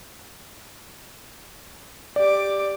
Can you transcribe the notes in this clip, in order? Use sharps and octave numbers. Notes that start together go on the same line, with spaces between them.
G4 D5 D6